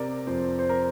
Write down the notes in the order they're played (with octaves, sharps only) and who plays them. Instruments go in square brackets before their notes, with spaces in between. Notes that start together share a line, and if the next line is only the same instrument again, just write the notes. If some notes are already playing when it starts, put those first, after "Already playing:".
Already playing: [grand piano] C3 A#4 D5
F2 C5
C5
A#4